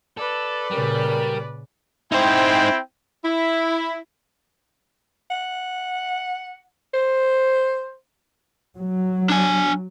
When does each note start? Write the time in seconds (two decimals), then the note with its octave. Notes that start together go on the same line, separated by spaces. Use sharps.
0.17 A4 B4 D5
0.71 A#2 C#3 G3 A#4
2.12 C4 D#4 E4 C5 G5
3.24 E4
5.31 F#5
6.94 C5
8.78 F#3
9.30 D4 G#5